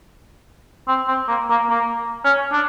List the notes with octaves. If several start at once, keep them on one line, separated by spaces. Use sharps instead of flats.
C4
C4
A#3
A#3
A#3
C#4
D4